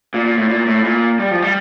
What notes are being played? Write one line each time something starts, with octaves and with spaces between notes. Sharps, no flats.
A#2
A#2
A2
A#2
A2
A#2
G3
F3
G3